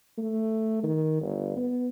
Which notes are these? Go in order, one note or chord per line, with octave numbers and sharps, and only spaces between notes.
A3
D#3
G1
B3